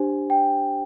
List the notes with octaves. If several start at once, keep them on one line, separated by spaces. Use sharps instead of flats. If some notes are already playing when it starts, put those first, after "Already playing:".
Already playing: D4 G4 C5 G#5
G5